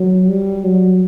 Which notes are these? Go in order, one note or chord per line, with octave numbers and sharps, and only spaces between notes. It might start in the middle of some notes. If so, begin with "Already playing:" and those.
Already playing: F#3
G3
F#3